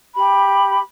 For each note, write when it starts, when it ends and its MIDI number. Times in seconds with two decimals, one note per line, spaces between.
0.14 0.78 67
0.14 0.78 83